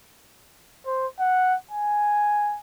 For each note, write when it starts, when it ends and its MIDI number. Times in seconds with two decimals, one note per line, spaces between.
0.86 1.07 72
1.19 1.56 78
1.71 2.58 80